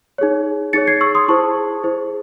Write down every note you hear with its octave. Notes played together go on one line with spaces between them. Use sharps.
D#4 G#4 C#5
D#4 G#4 C#5 A6 C#7
G#6 C7
C#6 E6
C6 D#6
E4 G#4 C5 A5 C#6
E4 G#4 C5